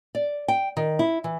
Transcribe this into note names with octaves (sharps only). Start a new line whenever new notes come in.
D5
G5
D#3
E4
E3